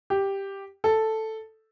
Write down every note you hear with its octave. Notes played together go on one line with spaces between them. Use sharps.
G4
A4